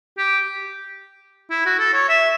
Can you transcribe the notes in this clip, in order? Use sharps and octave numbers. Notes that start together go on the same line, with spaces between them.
G4
E4
F#4
A4
C#5
E5